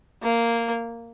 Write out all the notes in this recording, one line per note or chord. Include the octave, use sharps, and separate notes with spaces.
A#3